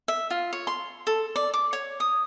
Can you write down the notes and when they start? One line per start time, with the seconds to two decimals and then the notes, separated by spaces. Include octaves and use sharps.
0.08 E5
0.31 F4
0.53 C#5
0.67 C6
1.07 A4
1.36 D5
1.54 D6
1.73 C#5
2.00 D#6